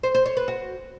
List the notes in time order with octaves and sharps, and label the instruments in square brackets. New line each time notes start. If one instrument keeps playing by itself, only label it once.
[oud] C5
C5
C#5
B4
F#4